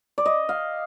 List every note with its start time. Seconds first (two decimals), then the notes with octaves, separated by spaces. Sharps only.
0.18 D5
0.26 D#5
0.49 F5